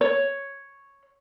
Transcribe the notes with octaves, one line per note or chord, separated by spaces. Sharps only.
C#5